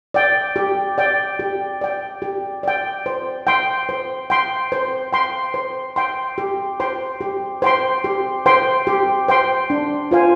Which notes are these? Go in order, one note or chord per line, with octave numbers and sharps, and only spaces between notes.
D5 G5
G4
D5 G5
G4
D5 G5
G4
D5 G5
C5
G5 C6
C5
G5 C6
C5
G5 C6
C5
G5 C6
G4
C5 G5 C6
G4
C5 G5 C6
G4
C5 G5 C6
G4
C5 G5 C6
D4
F4 C5 F5 G#5